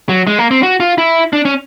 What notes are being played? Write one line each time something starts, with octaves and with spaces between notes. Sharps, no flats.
F#3
G#3
A#3
C4
F#4
F4
E4
D4
C#4